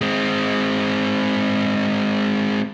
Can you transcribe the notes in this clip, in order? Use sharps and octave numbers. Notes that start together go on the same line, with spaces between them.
G#3 C4